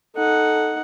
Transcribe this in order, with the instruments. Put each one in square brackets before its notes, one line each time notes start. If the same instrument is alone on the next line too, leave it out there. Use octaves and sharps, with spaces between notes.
[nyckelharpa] D#4 F#5 [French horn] A4